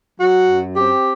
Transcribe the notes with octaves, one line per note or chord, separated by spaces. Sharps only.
F#3 F#4
F#2
C4 G4